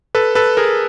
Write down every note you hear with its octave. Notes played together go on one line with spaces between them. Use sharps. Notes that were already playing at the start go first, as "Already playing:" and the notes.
A4 B4
A4 B4
G#4 A#4